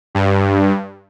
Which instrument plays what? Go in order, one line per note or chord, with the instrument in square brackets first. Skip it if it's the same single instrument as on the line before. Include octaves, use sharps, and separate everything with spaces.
[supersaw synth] G2